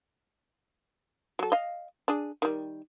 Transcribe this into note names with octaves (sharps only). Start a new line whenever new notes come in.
F#3 A4
D#5 F5
D4 G#4
D#3 G3